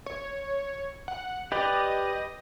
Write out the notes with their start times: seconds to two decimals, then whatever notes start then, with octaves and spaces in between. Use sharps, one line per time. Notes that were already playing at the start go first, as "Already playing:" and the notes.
0.06 C#5
1.08 F#5
1.52 G4 B4 D5 D#5